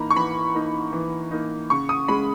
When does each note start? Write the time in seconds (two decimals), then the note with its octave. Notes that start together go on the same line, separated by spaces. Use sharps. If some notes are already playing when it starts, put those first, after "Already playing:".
Already playing: E3 A#3 D#4 A#5 B5
0.11 C#6
0.16 E3 B5
0.55 A#3 D#4
0.93 E3
1.31 A#3 D#4
1.70 C#3 C#6
1.89 D#6
2.08 G#3 C#4 B5